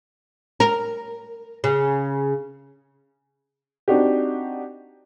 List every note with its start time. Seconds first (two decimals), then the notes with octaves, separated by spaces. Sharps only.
0.60 A#4
1.64 C#3
3.88 C4 D4 D#4 F#4 G4